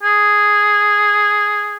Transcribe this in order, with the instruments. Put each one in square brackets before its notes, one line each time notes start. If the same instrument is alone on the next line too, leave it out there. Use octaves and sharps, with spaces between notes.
[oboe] G#4